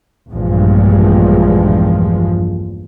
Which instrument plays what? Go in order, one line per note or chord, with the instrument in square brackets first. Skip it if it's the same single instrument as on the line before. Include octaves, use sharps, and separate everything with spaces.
[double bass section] A#1 E2 G2 F3 G#3